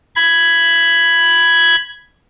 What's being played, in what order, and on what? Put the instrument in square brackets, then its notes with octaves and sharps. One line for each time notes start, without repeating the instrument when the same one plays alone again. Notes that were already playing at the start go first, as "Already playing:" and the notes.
[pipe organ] B5 G#6